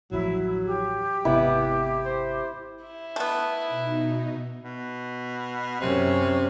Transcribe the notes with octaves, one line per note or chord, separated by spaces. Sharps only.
A1 D2 F3 F#3 E4
G4
G#1 C3 B3 E4
C5
E4
A3 B3
B2 D#4
B2
F#2 C3 C#4